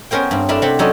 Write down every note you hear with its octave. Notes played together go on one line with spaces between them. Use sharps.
B3 C#4 A#4 C5 G5
G2 C4
A3 D4 E4 A#4 B4
C3 C4 F#5 B5
F#3 C#4 D#4 A4 C5 D5